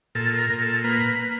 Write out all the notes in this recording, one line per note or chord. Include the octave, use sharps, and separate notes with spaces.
A#2 A4
A4
A#4
A#2
A4
A#3 B4
A#3